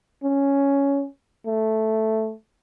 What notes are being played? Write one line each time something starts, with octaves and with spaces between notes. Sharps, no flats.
C#4
A3